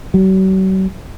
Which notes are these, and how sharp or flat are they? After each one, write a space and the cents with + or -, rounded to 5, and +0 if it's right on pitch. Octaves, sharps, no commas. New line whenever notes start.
F#3 +45